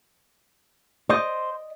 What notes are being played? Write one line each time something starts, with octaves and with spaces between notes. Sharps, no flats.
C5 D5 D#5